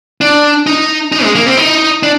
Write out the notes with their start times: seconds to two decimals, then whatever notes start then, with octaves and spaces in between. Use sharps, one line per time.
0.21 D4
0.67 D#4
1.12 D#4
1.24 G#3
1.35 A#3
1.46 C4
1.57 D#4
2.03 D4